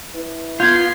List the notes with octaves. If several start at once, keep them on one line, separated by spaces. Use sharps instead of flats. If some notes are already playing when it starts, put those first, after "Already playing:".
E4 B4
B3 F4 G6 G#6 C7